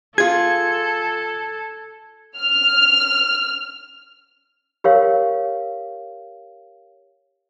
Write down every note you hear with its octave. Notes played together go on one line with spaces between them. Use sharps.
F4 G#4 A4 G#6
F6
G4 A#4 C#5 F5